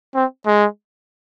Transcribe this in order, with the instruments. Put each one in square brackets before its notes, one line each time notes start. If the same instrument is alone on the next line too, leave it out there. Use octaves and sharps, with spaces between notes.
[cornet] C4
G#3